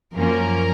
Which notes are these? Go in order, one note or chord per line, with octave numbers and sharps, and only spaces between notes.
F#2 F3 A#3 C#4 A#4